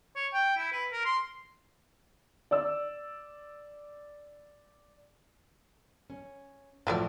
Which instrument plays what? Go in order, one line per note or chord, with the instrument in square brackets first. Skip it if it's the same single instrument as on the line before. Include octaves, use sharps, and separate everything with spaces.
[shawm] C#5
G5
E4
B4
A#4
C6
[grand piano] D5 E6
[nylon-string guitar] C#4
[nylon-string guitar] A2 F3 [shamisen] F#3 A3 D5